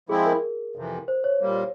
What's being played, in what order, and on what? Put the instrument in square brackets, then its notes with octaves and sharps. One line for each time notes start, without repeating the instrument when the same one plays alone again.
[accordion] F3 G#3 C4 E4 [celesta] G#4
[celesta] A#4
[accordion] F2 C3 E3
[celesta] C5
C#5
[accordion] A#2 G3 A#3